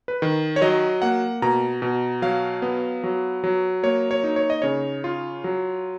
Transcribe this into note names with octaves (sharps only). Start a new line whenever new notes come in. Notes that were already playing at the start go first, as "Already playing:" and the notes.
B4
D#3
C#5
F#3 D#5
A#3 F#5
B2 A#5
B2
F#3 F5
B3
F#3
F#3
A#3 C#5
C#5
D#4
C#5
D#5
C#3 C#5
F4
F#3